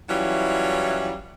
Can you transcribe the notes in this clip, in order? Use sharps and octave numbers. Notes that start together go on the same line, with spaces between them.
E3 F#3 G3 C#4 E4 F4